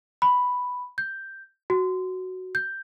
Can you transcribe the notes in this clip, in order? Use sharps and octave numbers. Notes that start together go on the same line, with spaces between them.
B5
G6
F#4
G6